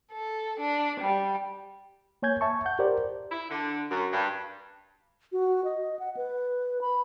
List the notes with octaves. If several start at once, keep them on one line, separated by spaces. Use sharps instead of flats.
A4
D4
G3
A#3 C#5 G#5 G6 G#6
E5 A5 C#6
F#5 G6
G4 A#4 C5 D5
E4
D3
F#2
G2
F#4
D#5
F#5
B4
B5